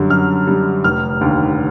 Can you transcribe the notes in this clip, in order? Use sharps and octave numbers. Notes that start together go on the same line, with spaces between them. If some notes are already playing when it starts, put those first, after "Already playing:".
Already playing: F#2 D3 G3
F#2 F6
D3 G3
F1 F6
D#2 D3